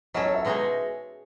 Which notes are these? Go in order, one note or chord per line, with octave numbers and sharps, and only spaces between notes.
F#3 C#4 E4 A4 D#5
C#5
E5
B2 G#3 D#4 G#4 C#5